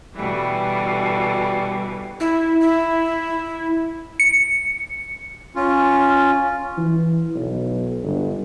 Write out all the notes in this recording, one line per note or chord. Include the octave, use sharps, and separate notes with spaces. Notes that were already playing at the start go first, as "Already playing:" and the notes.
B2 D3 E3 G3
E4
E4
C#7
C#4 F4
E3
B1
G1